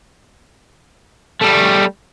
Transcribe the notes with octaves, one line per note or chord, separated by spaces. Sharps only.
G3 A3